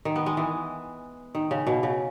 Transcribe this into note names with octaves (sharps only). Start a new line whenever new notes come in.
D#3
B3
G#3
E3
D#3
C#3
B2
C#3